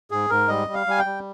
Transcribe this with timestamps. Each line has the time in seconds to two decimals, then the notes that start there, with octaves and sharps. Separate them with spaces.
0.11 G#2 G#4
0.30 G#2 A#4
0.48 G3 D#5
0.68 G3
0.74 F5
0.87 G3 G#5
0.99 G5
1.05 G3